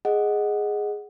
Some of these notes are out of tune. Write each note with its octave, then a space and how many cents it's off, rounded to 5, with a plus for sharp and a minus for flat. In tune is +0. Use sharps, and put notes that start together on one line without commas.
G#4 +0 D#5 +0 F#5 +0